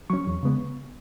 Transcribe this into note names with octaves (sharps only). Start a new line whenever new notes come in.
F#3 C#4 C#6
E2
C#3 G#3 B3